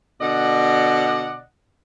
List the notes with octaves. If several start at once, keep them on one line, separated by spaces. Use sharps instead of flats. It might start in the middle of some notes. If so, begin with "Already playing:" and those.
B2 D3 D5 D#5 F#5